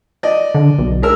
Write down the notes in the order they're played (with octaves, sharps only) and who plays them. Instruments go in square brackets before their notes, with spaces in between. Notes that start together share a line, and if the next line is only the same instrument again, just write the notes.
[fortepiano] D5 D#5
[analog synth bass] D3
B1
[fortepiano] G#3 A#4 E6